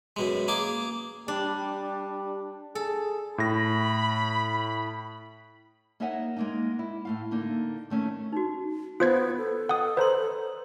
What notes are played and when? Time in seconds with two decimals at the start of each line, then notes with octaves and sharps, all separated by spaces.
0.16 F#2 B2 G#3
0.48 A#3 G#4 D6
1.28 G3 D4
2.75 G#4 A4
3.38 A2 B5 A#6
6.00 A#3 D#4 C#5 E5 F#5 G#5
6.36 G#3 A#3 D#4
6.79 E4
7.05 A2 A3 F5
7.31 D3 A#3 D#4
7.90 D#3 A3 C#4
8.32 D#4 F#4
9.00 B3 F4 C5 D#6 G#6
9.37 A4
9.69 D#5 F#5 D#6
9.97 B4 C5 D5 A#5 C6